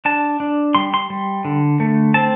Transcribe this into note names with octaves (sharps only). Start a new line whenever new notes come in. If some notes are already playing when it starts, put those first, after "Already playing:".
D4 A5
D4
G3 C6
C6
G3
D3
A3
C4 A5